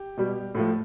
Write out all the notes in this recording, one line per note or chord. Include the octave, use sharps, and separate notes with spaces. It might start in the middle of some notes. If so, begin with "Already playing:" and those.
Already playing: G4
B2 G3
A2 F3 A3